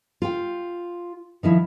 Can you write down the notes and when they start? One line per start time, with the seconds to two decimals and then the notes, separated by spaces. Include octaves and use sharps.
0.22 F4 G5
1.43 D#3 F3 E4